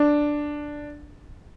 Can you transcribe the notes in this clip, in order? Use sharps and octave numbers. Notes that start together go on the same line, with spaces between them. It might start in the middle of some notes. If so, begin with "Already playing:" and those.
Already playing: D4